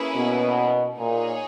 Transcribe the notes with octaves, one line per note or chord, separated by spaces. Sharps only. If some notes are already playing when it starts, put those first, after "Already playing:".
Already playing: A#3 C#4 E4 G#4 B4
B2
A#2 D#4 G#4 C#5